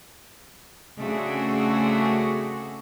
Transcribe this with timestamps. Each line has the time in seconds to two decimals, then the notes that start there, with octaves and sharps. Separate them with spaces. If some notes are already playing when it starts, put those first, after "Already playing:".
0.99 C#3 A3 C4 D4 F#4 G#4